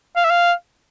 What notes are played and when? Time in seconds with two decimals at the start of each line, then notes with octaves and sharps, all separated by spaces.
0.16 F5
0.24 E5
0.30 F5